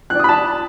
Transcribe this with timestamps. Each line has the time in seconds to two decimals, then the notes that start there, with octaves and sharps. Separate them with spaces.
0.10 F#6
0.15 D5
0.19 D#6
0.24 B5
0.29 A5